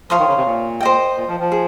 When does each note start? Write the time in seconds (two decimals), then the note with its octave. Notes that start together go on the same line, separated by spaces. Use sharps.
0.10 F3 C#5 F5 C6 D#6
0.19 D#3
0.28 C#3
0.37 C3
0.46 A#2
0.81 C5 D#5 G5
1.16 A#2
1.28 F3
1.40 F3
1.52 G#4